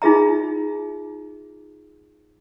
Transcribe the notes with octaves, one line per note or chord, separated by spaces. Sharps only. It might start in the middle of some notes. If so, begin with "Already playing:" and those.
D#4 F4 G#4 E5 A#5